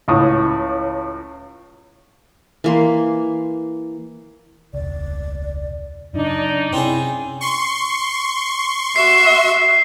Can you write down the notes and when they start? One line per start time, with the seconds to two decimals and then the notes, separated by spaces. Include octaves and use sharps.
0.08 C#2 A2 D#6
2.64 E3 A#3 C6
4.74 E1 C#2 D5
6.14 F#2 C#3 D4 D#4 D5
6.73 C3 C4 C#4 E4 G#4
7.41 C6 C#6
8.96 F#4 E5 C7